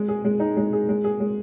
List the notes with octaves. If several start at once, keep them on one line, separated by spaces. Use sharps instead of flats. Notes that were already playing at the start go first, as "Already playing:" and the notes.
Already playing: G#3
G#4
G#3
D#4
G#3
G#4
G#3
G#4
G#3